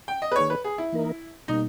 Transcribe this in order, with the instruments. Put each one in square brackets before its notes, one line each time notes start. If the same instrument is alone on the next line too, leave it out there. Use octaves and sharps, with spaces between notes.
[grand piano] G5
D#5
B4
[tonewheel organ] D#3 A#3 D#4 G#4 [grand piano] C#5
[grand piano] B4
G#4
E4
[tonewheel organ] E3 A#3 D#4 A#4
[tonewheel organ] B2 G3 A#3 [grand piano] D#4